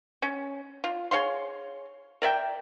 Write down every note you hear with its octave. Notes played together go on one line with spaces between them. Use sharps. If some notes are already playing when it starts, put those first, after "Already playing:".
C#4
F4
G#4 C#5 F5 C6
A#4 D5 E5 G5